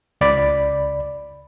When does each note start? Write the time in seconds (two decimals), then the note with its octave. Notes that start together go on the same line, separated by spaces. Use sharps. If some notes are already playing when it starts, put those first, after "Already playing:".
0.21 C#2 D5 B5